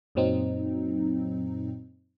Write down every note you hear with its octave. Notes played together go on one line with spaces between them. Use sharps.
F#2 A#2 F#3 C4 D#4